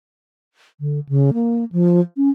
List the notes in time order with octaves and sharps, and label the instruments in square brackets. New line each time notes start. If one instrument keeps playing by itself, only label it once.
[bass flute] D3
C#3
A#3
F3
C#4